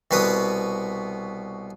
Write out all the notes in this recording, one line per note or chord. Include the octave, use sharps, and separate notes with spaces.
C2 B2 B3 B4 D#6